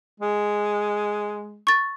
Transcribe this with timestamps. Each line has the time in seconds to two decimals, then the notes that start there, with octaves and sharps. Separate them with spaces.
0.20 G#3
1.67 C#6 A6